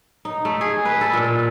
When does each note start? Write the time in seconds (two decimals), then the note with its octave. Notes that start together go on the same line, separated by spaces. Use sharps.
0.25 D#4
0.45 A3
0.61 G#4
0.85 B4
1.01 A4
1.13 A#2